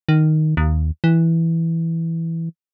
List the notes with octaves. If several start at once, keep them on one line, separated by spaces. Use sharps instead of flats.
D#3
D#2
E3